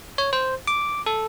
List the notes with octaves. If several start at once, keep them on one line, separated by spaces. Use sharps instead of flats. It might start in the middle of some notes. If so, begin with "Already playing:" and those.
C#5
C5
D6
A4